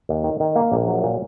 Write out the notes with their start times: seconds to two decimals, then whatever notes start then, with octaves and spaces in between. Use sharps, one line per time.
0.09 D#2
0.24 D#3
0.40 D#3
0.56 A#3
0.72 A#1
0.87 F#3
1.03 A#2